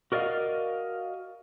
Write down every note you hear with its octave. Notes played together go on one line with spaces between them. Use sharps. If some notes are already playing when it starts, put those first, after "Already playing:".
F#4 A#4 D5 D#5 F5